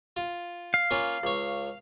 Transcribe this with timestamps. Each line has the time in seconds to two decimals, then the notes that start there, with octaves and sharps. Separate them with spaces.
0.16 F4
0.74 F5
0.91 A#3 C#4 F4
1.23 C#2 C#5